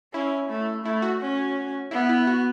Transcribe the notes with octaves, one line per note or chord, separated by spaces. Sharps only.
C#4 E4
A3
A3 E4
F#4
C#4
B3 E4
E4
F#4